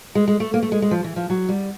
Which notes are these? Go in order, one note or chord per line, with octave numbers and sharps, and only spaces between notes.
G#3
G#3
A3
A#3
A3
G#3
G#3
F3
E3
F3
F#3
G3